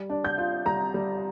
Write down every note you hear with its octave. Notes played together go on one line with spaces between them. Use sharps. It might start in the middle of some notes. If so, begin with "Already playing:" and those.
Already playing: G3
D4
G6
F4
G3 A#5
G3